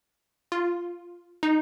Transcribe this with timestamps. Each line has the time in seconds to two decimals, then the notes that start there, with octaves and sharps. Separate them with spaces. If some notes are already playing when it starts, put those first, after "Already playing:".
0.52 F4
1.43 D#4